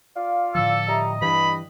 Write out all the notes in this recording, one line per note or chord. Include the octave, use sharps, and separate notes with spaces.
F4 D5 F5
A2 D3 F3 A4 E6
G3 D#5 E5 A#5
G2 E3 B5